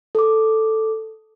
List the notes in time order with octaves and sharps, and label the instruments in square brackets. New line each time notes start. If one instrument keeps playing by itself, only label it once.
[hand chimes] A4 D6